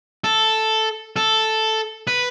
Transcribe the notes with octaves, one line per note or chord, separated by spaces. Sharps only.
A4
A4
B4